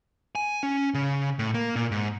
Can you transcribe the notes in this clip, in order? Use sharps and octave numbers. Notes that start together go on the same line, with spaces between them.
G#5
C#4
C#3
A2
A#3
A#2
G#2